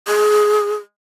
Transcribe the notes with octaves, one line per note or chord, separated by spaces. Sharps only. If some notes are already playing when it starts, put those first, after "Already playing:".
G#4